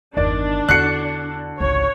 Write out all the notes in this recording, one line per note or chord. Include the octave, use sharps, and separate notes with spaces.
G1 E2 D#3 D4 D5
E2 D3 E4 F#4 F#6 C7 C#7
G#1 C#2 C#5